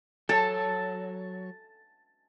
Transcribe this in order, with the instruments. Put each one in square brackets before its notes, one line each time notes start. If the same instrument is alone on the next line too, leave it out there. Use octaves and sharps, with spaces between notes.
[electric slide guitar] F#3 C#5 [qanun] A4 [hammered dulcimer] A5